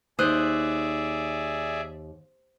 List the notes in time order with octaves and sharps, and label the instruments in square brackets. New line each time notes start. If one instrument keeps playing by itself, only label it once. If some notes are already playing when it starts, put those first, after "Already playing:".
[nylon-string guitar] D#2 [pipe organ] G#4 D5 E5 [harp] C5 D#6 F#6